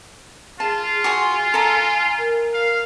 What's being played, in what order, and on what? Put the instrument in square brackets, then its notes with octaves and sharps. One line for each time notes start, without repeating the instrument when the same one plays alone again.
[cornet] F4 [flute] G#4 [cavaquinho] A5
[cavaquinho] F#4 G#4 C6 [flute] G#5
[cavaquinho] A4 A#5
[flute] A#4
[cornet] F5